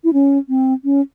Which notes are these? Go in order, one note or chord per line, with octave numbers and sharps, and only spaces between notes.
E4
C#4
C4
C#4